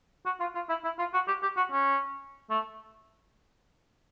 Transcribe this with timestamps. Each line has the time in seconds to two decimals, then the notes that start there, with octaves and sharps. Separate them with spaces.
0.25 F#4
0.40 F4
0.55 F4
0.69 E4
0.84 E4
0.99 F4
1.14 F#4
1.28 G4
1.42 G4
1.56 F#4
1.72 C#4
2.50 A3